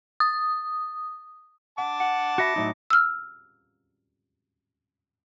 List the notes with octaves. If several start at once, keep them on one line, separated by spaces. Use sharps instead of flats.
D#6
F#5 A5 D6
F#5 C#7
F#4 E5 B5 A#6 C#7
A2 F#3 D#4 E5
E6 F6